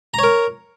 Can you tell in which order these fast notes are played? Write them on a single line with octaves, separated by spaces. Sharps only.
A#5 C#5 A#4